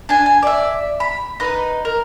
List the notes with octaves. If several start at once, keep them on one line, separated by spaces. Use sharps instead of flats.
D4 G#5
G#5
D5 E5
B5
D#4 B4
A#4